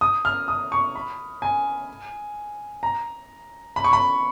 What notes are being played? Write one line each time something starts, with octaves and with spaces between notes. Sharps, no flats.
D#6
F6
D#6
C#6
B5
G#5
A#5
B5
C#6
B5